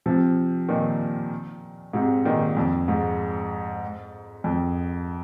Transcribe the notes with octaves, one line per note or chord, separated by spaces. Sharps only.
C3 F3
A#2 D#3
G#2 C3
A#2 D#3
F2
G#2
F2